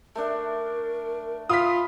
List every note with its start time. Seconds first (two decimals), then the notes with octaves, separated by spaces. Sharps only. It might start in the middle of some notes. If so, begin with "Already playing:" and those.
0.16 A3 D4 A#4
1.50 F4 F5 B5 D#6 B6